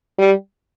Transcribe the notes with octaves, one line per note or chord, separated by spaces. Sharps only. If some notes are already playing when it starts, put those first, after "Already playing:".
G3